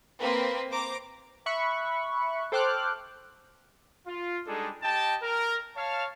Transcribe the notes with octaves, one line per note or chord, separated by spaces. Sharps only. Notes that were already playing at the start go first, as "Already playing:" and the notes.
A#3 C4 B4 C5
C5 A#5 D6
E5 B5 C#6 F#6
A4 C5 G5 D6 F6 F#6
F4
G3 G#3 D4 D#4 G#4 A4
G4 D#5 G5 A5
A#4
C#5 F5 A5